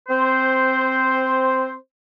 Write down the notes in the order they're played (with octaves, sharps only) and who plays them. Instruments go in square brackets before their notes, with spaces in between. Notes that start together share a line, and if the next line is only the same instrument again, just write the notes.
[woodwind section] C4 C5